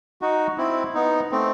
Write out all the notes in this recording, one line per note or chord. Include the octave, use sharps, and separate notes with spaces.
D#4 F#4
C4 E4
B3 D#4
A3 C4